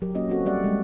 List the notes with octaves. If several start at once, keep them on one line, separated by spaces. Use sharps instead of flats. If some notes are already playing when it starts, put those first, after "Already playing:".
F#3 G4 A#4
A#3 C#4 F#4 D#5
C4 C#4 F#4 A4
G3 C#4 G4 D5 E5 F#5
G3 G#3